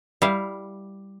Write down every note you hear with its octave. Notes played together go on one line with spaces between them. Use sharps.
G3 E4 F5